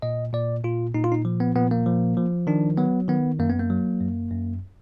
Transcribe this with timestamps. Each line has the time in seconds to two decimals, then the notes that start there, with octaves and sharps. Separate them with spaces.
0.02 A#2 D#5
0.33 A#2 D5
0.64 A#2 F4
0.94 A#2 D#4
1.04 F4
1.12 D#4
1.25 F3
1.40 B3
1.55 A#2 B3
1.71 A#3
1.86 F3
2.17 F3
2.47 D#3 D4
2.78 F#3 B3
3.08 D#3 B3
3.39 F#2 A#3
3.49 B3
3.59 A#3
3.70 F#3
4.00 F#2
4.31 F#2